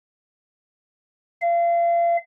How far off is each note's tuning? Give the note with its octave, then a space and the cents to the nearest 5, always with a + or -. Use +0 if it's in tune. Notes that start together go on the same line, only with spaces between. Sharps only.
F5 -35